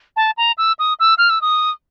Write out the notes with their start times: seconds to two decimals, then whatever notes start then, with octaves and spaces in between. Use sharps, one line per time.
0.16 A5
0.37 A#5
0.58 E6
0.79 D#6
1.00 E6
1.18 F6
1.30 E6
1.41 D#6